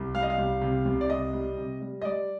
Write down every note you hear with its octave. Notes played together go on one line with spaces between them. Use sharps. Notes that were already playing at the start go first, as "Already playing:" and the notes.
Already playing: C2
G3 F5
D#5
F5
C2
C3
C2
D5
C3 D#5
G3
C3
G3
D#5
G3 D5